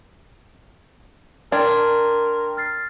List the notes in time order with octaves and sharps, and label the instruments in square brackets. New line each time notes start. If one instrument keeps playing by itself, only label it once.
[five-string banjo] D4 [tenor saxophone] A#4 [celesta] G5 C6 G#6
[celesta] F6 A6 C7